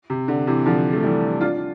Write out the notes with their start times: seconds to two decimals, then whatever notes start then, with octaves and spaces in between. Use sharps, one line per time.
0.10 C3
0.28 D3
0.47 C3 E3
0.66 D3 F3
0.93 A3
1.03 E3 G3
1.41 D4 F4
1.57 D4